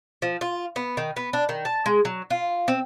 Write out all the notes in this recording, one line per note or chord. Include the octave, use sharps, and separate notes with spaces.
F3
F4
B3
D#3
B3
D4
D#3
A5
G#3
F#3
F4
C4